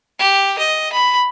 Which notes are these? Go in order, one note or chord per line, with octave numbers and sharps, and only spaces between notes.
G4
D#5
B5